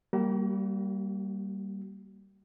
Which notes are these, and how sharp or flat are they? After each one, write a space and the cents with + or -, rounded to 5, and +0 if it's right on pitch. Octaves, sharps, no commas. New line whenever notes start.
G3 -10 A#3 -10 F#4 +45